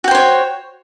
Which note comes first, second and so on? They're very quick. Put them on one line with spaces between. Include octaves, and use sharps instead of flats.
F#4 G5 C5 C#5